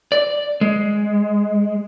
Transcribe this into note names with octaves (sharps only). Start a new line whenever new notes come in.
D5
G#3